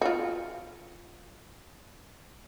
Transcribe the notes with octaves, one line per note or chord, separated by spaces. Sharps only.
F4 F#4